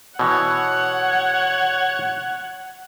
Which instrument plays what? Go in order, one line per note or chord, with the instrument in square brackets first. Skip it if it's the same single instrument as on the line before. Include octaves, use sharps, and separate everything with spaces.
[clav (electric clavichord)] B2 E3 [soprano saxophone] C#5 [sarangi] F#5